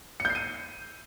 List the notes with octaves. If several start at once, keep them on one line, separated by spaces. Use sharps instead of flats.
C#7
G6
C7
D#7